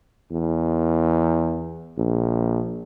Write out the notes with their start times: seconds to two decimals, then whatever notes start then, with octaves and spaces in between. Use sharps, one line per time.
0.31 E2
1.98 A#1